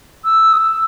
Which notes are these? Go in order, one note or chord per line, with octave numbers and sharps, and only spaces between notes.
E6
D#6
E6